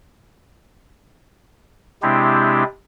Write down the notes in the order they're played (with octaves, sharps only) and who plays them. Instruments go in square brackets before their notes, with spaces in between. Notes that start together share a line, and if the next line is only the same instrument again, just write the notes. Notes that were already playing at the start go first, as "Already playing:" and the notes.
[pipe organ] C3 G#3 C4 D4 E4 G4